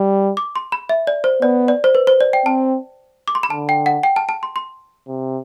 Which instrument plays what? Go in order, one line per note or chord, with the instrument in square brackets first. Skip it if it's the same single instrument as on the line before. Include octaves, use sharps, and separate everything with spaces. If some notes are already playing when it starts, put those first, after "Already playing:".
Already playing: [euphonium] G3
[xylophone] D6
C6
B5
E5
D5
C5
[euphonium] B3 [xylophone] D5
[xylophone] D5
C5
B4
C5
D5
G5
[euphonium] C4 [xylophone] A5
[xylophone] D6
C6
B5
[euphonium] D3 [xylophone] A5
[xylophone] G5
F#5
G5
A5
A5
C6
C6
[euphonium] C3